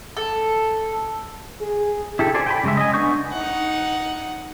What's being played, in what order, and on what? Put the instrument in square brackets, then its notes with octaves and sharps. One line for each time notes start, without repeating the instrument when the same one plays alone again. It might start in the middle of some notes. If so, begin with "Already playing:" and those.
[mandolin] A4
[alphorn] G#4
[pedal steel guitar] E4 G4 A4
A4 C5 D5 G#5
G5 G#5 B5
C#3 G#3 E5
D#5 G#5
B3 D4 C#6 G6
[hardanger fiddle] D#4 F#5